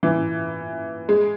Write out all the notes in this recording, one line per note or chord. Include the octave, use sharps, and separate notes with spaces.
E3
G#3